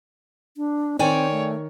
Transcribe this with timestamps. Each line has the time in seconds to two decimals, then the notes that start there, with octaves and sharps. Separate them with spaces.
0.57 D4
0.99 D#3 C4 C#5 D5 G5 G#5
1.31 A3